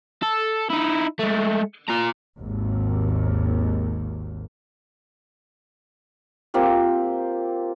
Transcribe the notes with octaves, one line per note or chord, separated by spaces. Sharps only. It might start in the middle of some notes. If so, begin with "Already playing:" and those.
A4
D#4 E4
G#3 A3
F4 A#5
G#1 D#2
A#3 C4 F4 G4